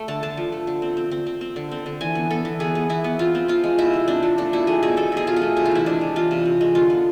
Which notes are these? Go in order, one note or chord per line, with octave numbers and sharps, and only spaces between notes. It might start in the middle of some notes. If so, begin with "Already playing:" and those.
Already playing: A3
D3 A5
D3 A5
F3
A3
D3
C4
C4
C4
C4
C4
D3
C4
D3
E3 G#5
B3
B3 A4
E3
B3 G#4
B3
E3 E4
B3
C4 F4
C4
F3 F4
G#3
C3 E4
C4
C4 D4
F3
A3 D4
B2 E4
A3 G#4
B2 G#4
C4 A4
B2 G#4
B2 F4
G#4
A3
C3 E4
F4
E3 E4
G#3 D4
C3
E3 F4
C3
C3
G#3
D3 F4
B3